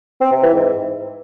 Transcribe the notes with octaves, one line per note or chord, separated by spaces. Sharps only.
C4
C3
E3
G#2